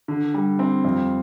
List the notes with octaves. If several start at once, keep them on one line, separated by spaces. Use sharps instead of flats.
D3
G3
C4
F2